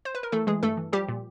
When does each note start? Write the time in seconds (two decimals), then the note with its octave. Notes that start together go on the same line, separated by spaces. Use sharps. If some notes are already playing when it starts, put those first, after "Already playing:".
0.05 C5
0.15 B4
0.23 A#4
0.32 E3 A3 A4
0.47 E3 G#3 G#4
0.63 G2 A3 A4
0.77 E3
0.92 F3 G3 G4
1.09 A#2